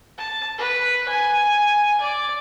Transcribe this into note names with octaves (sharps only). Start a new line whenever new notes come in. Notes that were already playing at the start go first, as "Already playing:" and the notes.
A5
B4
G#5
D5